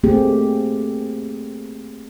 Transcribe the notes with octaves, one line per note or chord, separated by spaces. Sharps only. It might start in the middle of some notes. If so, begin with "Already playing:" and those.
A3 A#3 C4 G4 G#4